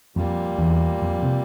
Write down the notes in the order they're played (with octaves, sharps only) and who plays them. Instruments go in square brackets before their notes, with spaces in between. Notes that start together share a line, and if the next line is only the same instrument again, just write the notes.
[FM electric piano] F2 [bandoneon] A#2 G3 A#3
[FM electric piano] E2
F2
C3